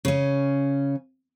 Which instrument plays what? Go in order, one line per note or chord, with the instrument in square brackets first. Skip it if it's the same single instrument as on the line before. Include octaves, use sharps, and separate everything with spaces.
[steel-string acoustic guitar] C#3 C#4